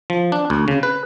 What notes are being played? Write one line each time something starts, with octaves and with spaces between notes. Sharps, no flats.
F3
D4
D2
C#3
B4